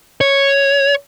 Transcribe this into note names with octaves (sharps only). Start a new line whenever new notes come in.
C#5